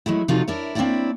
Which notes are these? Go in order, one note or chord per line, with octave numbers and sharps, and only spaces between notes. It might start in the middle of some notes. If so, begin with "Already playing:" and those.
F#3 G#3 A3 E4
C3 F3 D#4 F4 F#4 A4
D4 E4 A#4 C#5
A#3 C4 D4 E4 C#5 D5